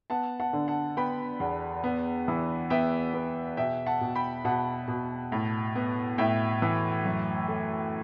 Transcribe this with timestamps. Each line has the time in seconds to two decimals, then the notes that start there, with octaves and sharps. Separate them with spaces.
0.10 B3 F#5 A5
0.40 F#5 A5
0.53 D3
0.68 F#5 A5
0.97 B3 G5 B5
1.40 E2
1.84 B3
2.28 E3
2.70 B3 E5 G5
3.14 B3
3.57 B2 E5 G5
3.86 F#5 A5
4.01 B2
4.15 G5 B5
4.45 B2 F#5 A5
4.88 B2
5.32 A2
5.76 B3
6.18 A2 E5 G5
6.62 E3
7.05 F#2
7.48 A3